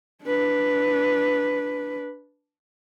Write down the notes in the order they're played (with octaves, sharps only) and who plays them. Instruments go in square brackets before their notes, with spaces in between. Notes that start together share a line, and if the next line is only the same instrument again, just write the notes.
[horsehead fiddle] D4 B4